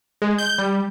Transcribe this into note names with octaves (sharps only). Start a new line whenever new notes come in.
G#3
G6
G3